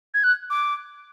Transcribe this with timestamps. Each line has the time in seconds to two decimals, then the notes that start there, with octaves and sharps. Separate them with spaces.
0.14 G#6
0.24 F#6
0.50 D6